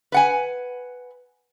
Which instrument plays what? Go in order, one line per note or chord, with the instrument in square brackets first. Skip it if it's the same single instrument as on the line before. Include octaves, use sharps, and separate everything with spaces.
[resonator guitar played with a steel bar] B4 F#5 G#5